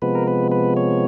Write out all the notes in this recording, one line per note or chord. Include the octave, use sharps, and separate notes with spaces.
C3 F3 G#3 B3 B4
A#4
B4
B4
C#5